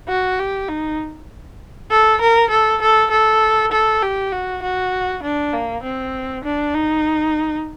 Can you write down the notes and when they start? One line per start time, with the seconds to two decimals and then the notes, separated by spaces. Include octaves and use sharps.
0.08 F#4
0.39 G4
0.69 D#4
1.90 A4
2.21 A#4
2.50 A4
2.81 A4
3.10 A4
3.71 A4
4.02 G4
4.32 F#4
4.62 F#4
5.23 D4
5.53 A#3
5.83 C4
6.44 D4
6.74 D#4